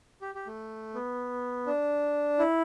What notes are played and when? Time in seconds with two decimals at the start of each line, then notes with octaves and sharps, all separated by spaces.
0.21 G4
0.35 G4
0.47 A3
0.94 B3
1.66 D4
2.39 E4